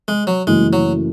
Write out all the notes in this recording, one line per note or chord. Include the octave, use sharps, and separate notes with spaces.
G#3
F#3
F#1 F#2 E3 G#3 A3 E4
F#3